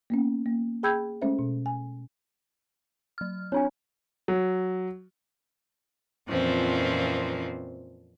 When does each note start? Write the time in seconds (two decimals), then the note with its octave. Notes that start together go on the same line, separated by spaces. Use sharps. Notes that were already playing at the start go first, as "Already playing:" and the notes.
0.10 A#3 B3 C#4
0.46 A#3
0.83 G#4 G5 B5 E6 G6 G#6
1.22 G#3 A3 C#4 A4 C5 E5
1.39 B2
1.66 G#5
3.18 F#3 F6
3.52 C4 D4 C#5 G#5
4.28 F#3
6.29 F2 A#2 E3 F3 C4 C#4